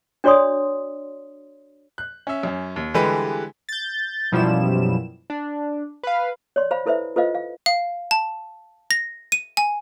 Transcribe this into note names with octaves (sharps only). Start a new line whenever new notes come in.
D4 F#4 C#5 D5 C6 D#6
F#6
C#4 E5
F#2 C#4
D#2
D3 E3 G3 G#3 G4 B4
G6 A6
F#2 B2 F3 G3 E4 E7
D4
B4 F5
C#5 D5 C6
C5 F5 B5
E4 A4 B4 C5 E5
F4 A4 B4 C5 D#5 F5
F5
F5
A5
A#6
D#7
G#5